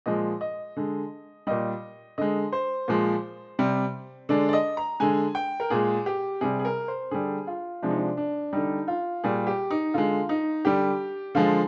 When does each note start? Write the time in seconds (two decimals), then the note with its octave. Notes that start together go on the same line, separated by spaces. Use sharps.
0.06 A#2 F3 G#3 D#5
0.41 D#5
0.76 D3 G#3
1.47 A#2 G3 D#5
2.18 D3 G#3 D#5
2.53 C5
2.88 A#2 F3 G#3
3.59 C3 G3
4.29 D3 G#3 D5
4.49 D5
4.53 D#5
4.77 A#5
5.00 D3 G#3 G#5
5.35 G5
5.60 A#4
5.70 A#2 G#3 G#4
6.06 G4
6.41 C3 G3 G#4
6.59 G#4
6.65 A#4
6.88 C5
7.11 D3 G3 G#4
7.47 F4
7.82 C3 F3 G#3 D4
7.90 D#4
7.98 D4
8.17 D4
8.53 D3 G3 D#4
8.88 F4
9.24 A#2 G3 G#4
9.47 G4
9.70 D#4
9.94 D3 G#3 F4
10.29 D#4
10.65 D3 G3 G4
11.35 D3 F3 G#3 F4